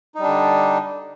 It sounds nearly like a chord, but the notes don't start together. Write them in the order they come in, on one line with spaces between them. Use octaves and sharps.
D#4 G3 D4 D3